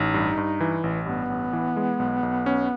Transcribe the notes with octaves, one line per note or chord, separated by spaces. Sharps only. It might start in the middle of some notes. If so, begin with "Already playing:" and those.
Already playing: A1 D#4
G2
G2
E3
A1
G2 B3
A1
E3
G#3
B1
B1
C#4